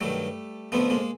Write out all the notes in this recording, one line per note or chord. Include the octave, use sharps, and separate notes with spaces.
G2 D#3 F#3 G3 A3
F2 D3 F3 A3 B3
G#3 A#3